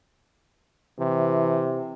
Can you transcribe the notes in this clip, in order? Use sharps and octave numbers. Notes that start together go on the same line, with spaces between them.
C3 E3